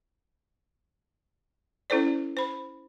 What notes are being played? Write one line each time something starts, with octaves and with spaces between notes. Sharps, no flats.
C#4 E4 A4 C5 D5
C5 B5